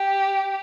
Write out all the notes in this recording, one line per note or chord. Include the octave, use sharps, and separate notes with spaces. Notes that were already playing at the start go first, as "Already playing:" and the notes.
Already playing: G4